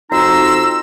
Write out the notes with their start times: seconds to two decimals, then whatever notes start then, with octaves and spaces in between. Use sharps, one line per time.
0.11 F2 D#4 F#4 A#5 C6 E6